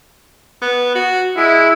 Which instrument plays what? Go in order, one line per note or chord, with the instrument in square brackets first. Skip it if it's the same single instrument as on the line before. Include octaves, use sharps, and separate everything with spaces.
[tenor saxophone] B3
F#4
[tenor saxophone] G#3 [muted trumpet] E4